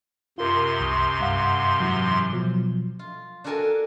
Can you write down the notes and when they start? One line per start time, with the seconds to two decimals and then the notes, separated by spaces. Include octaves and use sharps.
0.38 F#2 C3 F4 A#4 C6
0.81 C2 C#6 D#6
1.20 G2 F5 F#5
1.80 G#2 E3 F#3
2.33 B2 F3 F#3
2.99 F4
3.44 D4 F#4 A4 A#4 G#5 A5